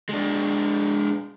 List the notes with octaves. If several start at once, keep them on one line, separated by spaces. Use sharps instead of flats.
G#3 D4